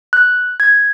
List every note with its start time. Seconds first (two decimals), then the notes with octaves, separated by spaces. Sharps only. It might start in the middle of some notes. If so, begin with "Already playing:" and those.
0.13 F#6
0.60 G#6